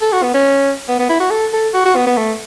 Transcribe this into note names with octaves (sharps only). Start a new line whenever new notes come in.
A4
F#4
B3
C#4
B3
B3
E4
F#4
A4
A4
F#4
F#4
B3
B3
A3